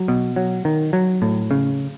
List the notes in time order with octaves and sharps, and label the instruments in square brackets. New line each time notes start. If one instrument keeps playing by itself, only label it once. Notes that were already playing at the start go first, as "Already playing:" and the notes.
Already playing: [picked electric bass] F#3
B2
F#3
D#3
F#3
A2
C#3